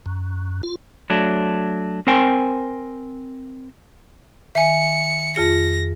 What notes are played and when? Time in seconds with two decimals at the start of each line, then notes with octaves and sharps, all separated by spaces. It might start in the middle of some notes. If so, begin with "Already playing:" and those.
0.06 F#2
0.63 F4
1.10 F#3 A3 D4
2.07 C4 A#4 C5 G5 G#5
4.55 D#3 E5 G#5 C#7
5.36 F2 F4 G#4 A#6 C#7